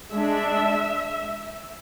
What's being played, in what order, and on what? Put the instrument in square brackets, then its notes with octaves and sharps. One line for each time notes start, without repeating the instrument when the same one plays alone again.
[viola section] G#3 D4 E5